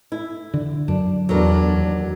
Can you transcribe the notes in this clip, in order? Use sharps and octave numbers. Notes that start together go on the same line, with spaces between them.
E4
D3
F#2 D4
E2 F#3 G3 D4 A#4
D#2